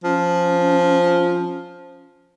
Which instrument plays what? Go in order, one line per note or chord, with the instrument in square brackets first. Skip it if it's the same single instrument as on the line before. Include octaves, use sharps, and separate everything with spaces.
[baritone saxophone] F3 [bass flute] C#4